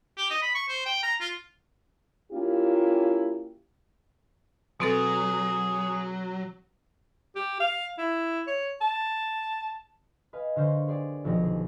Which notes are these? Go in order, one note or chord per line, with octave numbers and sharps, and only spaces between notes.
G4
D#5
B5
C#6
C5
G5
A#5
F4
A#3 C#4 E4 F4 G4
B2 F#3 C4 G#4 A4
G4
F5
E4
C#5
A5
B4 D#5 F5 G#5
D3 A#4 C5 F5 C#6 G6
G4 G#4 D5
D#1 B1 F3 G4 A#6
G#4